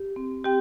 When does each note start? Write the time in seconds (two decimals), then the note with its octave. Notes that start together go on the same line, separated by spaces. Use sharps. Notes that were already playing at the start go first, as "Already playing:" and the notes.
Already playing: G4
0.16 C4
0.44 C4 G4 G5